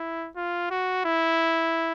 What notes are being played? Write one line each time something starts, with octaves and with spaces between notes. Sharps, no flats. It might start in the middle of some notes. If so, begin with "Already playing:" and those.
Already playing: E4
F4
F#4
E4